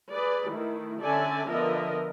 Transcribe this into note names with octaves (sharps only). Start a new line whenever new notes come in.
G#4 B4 D5
D#3 A3 E4
D3 C#4 A4 D5 E5 G#5
D3 F3 B3 A#4 D#5 E5